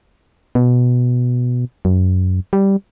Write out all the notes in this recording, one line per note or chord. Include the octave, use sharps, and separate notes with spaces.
B2
F#2
G3